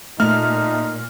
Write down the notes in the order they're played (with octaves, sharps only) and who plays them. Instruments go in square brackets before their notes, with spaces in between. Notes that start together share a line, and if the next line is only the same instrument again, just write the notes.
[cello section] A#2 [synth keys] A3 [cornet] D#4 [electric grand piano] F6